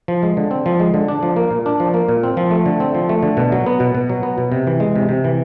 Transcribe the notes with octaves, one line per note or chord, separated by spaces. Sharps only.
F3
G#3
D3
C4
F3
G#3
D3
D4
F3
A#3
A#2
D4
F3
A#3
A#2
C4
F3
A3
D3
C4
F3
A3
D3
B2
F#3
B3
B2
B2
F#3
B3
B2
C3
E3
G#3
C3
C3
E3